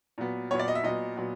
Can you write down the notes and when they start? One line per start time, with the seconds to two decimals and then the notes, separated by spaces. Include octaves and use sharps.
0.18 A#2 F#3 B3
0.51 A#2 F#3 B3 C#5
0.59 D5
0.68 D#5
0.75 E5
0.83 A#2 F#3 B3 D#5
1.17 A#2 F#3 B3